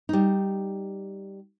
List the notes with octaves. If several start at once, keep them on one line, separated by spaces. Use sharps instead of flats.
G3 D#4